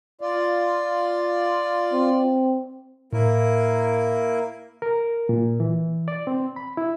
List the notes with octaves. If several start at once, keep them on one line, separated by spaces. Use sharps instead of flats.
F4 D5
C4
A2 A#3 E4 A#4
A#4
A#2
E3
D5
C4
B5
E4